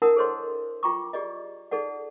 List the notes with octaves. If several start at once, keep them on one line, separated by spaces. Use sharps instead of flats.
D4 E4 A#4 F#5 A5 D#6
G#4 A4 C5 C#5 D#5 C6
F4 G5 A#5 C#6 D6
G4 G#4 D5 D#5
D#4 G#4 A4 D5 F#5